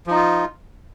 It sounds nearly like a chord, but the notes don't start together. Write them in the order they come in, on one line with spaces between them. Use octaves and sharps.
F3 D#4 F4